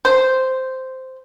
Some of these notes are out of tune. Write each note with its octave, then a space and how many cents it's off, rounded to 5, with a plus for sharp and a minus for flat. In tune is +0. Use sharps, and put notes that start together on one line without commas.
C5 -5